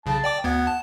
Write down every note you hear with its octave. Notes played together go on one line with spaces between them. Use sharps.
B1 C#3 A5
D5 G5 D6
D2 B3 F#5 G#6
A5